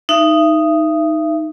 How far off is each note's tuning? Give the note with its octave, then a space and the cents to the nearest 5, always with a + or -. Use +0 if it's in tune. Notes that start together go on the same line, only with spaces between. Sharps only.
D#4 +0 E5 +35